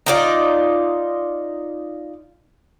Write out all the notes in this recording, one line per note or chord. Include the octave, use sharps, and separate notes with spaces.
D#4 F4 D5